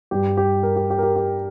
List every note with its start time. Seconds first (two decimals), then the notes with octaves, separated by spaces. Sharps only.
0.11 G2 G3 G4
0.37 G4
0.63 A#4
0.76 G4
0.90 G4
0.98 A#4
1.03 G4
1.16 G4